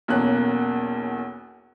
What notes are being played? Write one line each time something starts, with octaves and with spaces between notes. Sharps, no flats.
B1 E2 A#3 C#4 F#6